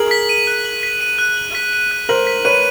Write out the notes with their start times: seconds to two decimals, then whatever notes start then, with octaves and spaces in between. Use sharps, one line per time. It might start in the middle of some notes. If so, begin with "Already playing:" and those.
Already playing: G#4 A#4 F#7
0.11 B6
0.29 D#7
0.47 F#6
0.65 F#7
0.83 B6
1.01 D#7
1.19 F#6
1.37 F#7
1.55 B6
1.73 D#7
1.91 F#6
2.09 A#4 C5 F#7
2.27 B6
2.45 B4 C#5 D#7